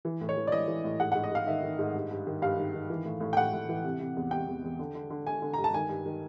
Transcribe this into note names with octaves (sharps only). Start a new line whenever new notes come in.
E3
A2
C#5
E3
D5
E3 D#5
E3
A2
G#2 F#5
G#2 F#5
D#5
G#2 F5
D#3 E5
D#3
G#2
G2
G2
D#3
G2 F5
D#3
D#3
E3
A2
A2
G5
A2 F#5
A2
E3
C3
C3
E2
C3 G5
E2
E2
D3
D3
D3
D3 G#5
D3
G2 A#5
A5
D#3 G#5
G2
D#3